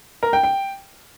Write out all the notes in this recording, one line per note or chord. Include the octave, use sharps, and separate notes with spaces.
A#4
G5
G5